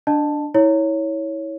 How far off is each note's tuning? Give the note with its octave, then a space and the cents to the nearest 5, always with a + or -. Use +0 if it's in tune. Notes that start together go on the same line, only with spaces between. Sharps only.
D4 +0 D#5 -35 A5 +0
E4 -30 C#5 +0